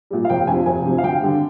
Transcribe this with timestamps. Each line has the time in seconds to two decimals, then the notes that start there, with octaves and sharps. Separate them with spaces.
0.11 A#2 G3
0.25 F5
0.29 F1 G5
0.47 F2 C3 G#5
0.66 F1 G#5
0.85 F2 C3
0.98 F5
1.03 D2 G5
1.23 D3 G3